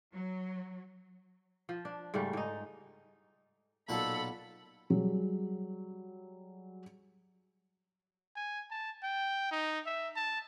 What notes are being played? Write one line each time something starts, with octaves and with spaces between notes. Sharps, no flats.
F#3
F3
D4
G#2 C#3 G3 A3
G#2 D#4
B1 A#2 A4 F#5 B5
F#3 G3 G#4
G#5
A5
G5
D#4
E5
A5